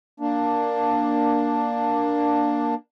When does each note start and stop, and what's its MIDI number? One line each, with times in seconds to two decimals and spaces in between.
0.20 2.74 58
0.20 2.74 62